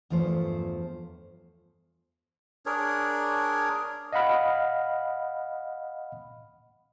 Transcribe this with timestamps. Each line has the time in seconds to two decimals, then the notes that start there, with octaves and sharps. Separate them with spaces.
0.10 E2 G2 F3 A3 C5
2.66 D4 G#4 A#4 C#5
4.12 D#5 F5 F#5 B5 F6